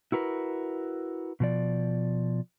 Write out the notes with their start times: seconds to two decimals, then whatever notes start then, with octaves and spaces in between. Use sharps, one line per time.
0.12 E4 F#4 A#4 B4
1.40 B2 F3 D5